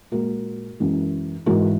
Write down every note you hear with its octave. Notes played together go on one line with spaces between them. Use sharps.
A#2 G#3 F#4 A#4
F#2 E3 G#3
G#2 E3 G#3 F#4 A#4